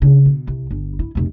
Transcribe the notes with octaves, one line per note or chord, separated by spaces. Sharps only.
C#3 D4
B2
C2
G1
E4
F1 B2